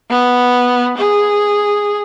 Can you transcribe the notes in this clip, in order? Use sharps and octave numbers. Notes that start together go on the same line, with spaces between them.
B3
G#4